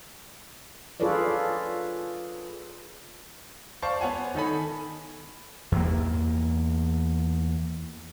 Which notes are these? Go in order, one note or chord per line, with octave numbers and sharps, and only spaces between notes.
F4 G#4 A4 B4 C#5 D5
C5 D5 F5 A5 C#6
B3 C#5 F#5 G#5
D#3 D#4 A4 G#5 B5
E2 A#3